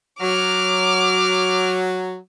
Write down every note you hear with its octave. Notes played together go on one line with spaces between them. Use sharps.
F#3 D6 F6